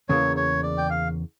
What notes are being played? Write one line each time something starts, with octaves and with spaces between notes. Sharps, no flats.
E2 C#3 E3 A#3 C#5
C#5
D5
G5
F5